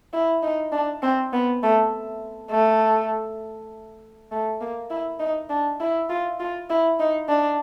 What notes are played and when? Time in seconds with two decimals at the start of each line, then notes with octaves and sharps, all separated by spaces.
0.13 E4
0.43 D#4
0.72 D4
1.03 C4
1.33 B3
1.63 A3
2.51 A3
4.31 A3
4.61 A#3
4.90 E4
5.20 D#4
5.50 D4
5.80 E4
6.10 F4
6.40 F4
6.70 E4
7.00 D#4
7.29 D4